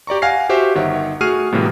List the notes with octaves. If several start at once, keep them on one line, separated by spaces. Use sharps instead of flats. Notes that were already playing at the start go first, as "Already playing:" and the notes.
G4 D5 A#5 C#6
F5 F#5 G#5 F6 A#6 C7
F#4 G4 C5 E5 G5
G1 D#3 C#5 E5 F#5
A3 F#4 G#4 F6 C7 D#7
A2 C3 E3 F#3 G#3 A#3